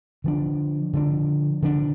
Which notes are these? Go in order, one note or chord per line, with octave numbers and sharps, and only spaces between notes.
D3 F3 D4
D3 F3 D4
D3 F3 D4